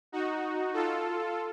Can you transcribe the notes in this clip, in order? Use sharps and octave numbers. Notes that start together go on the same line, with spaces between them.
D#4 F#4
F4 A4